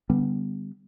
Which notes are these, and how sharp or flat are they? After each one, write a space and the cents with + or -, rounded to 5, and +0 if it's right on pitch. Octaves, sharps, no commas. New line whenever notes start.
D3 -15 G3 +0 B3 +0